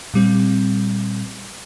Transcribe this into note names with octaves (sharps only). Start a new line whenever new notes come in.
A#2 G3 C4